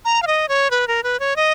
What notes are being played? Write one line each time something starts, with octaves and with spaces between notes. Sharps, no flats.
A#5
F5
D#5
C#5
B4
A#4
B4
C#5
D#5